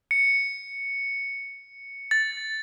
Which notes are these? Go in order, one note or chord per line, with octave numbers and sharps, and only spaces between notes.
C#7
A6